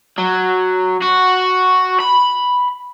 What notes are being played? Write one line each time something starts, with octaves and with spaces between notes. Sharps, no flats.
F#3
F#4
B5